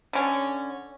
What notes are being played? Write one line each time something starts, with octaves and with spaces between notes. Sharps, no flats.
D3 C#4